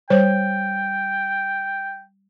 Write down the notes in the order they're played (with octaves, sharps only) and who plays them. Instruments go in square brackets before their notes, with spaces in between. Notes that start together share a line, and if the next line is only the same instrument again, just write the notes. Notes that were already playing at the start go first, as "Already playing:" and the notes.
[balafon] G3 C5 C#5 [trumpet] G5